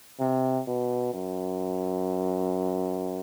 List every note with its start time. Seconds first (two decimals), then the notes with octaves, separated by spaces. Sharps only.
0.20 C3
0.67 B2
1.14 F#2